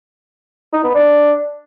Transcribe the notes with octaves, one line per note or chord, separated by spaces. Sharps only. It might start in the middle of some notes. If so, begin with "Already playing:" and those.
D#4
B3
D4